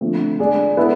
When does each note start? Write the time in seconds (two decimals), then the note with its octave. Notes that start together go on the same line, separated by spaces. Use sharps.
0.01 D3 F3 A3 C4
0.39 G#3 D4 G#4 D5
0.77 B3 E4 A4